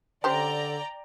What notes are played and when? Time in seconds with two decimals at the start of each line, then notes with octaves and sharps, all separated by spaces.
0.24 D3 C#4 G4 C5 D5 G5 A#5